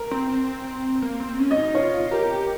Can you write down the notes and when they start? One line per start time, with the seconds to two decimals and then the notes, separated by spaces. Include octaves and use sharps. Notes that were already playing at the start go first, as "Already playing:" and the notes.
Already playing: A#4
0.11 C4
0.30 C4
1.02 A#3
1.20 C4
1.39 C#4
1.51 D#5
1.57 D#4
1.75 F4 C#5
2.11 G4 A#4